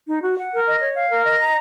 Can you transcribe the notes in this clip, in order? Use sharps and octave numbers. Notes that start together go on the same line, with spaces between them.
D#4
F#4
F#5
A#4
D#5
C#5
F5
A#4
D#5
A#5